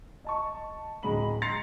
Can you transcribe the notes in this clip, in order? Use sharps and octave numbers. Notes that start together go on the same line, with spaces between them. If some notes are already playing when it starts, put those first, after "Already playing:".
D#5 A5 C#6
D1 D3 G#3 A#5 B5 F#7
A#5 C6 A6 C7 C#7 F7